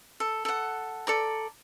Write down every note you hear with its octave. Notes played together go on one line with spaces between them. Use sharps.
A4
A4 F#5
A4 D5 A#5